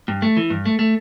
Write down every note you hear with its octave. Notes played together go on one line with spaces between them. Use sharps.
G2
A3
E3
G2
A3
A3